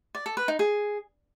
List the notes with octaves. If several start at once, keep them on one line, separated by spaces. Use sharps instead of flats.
D5
A4
B4
D#4
G#4